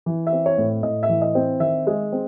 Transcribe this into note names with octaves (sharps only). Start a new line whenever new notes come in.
E3
E5
C4
C#5
A2
A2 D#5
E5
E3
D#5
C4
D#3 E5
G#3
C4